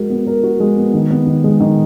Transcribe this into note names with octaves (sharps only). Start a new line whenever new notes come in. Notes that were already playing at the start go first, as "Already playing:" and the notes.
Already playing: G#3 F#4 A#4
B3
A#4
F#4
G#3
B3
D#3
B3
D#3
G#3
D#3